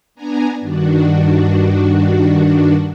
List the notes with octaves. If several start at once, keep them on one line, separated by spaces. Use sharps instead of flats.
B3 D4 G#5 A#5
G2 D#3 D4 F#4